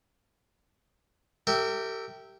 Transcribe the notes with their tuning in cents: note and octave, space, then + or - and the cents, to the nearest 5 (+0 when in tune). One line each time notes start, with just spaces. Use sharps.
G4 -10 A#4 -40 E5 -10